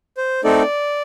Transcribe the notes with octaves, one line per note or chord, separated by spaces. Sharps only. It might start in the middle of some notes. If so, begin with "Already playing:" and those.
C5
A3 C4 D#4 A4 D5